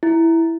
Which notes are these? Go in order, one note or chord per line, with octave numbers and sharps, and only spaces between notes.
E4